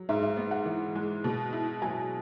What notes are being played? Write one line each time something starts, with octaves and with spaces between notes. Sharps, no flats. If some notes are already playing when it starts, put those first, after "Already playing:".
Already playing: F#3
G#2 E5
E5
B3
F#5
E3
G#3
B2
E4
F#3 G#5